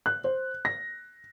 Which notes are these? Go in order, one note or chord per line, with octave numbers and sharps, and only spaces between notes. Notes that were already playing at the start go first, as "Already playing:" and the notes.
F#6
C5
A#6